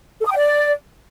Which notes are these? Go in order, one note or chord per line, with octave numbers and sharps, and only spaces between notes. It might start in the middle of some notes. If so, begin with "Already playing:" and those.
A4
D#6
G5
D5